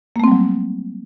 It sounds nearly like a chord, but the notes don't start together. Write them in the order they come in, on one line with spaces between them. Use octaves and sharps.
A#3 A3 C4 G3 F#3